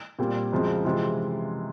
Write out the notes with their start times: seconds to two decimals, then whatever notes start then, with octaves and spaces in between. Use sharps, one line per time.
0.19 A#2 G3 C4 F4
0.52 F#2 C#3 F3 G#3 C4
0.85 C3 E3 G#3 C4 F4